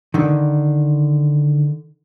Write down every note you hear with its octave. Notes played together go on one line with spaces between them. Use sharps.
D3 D#3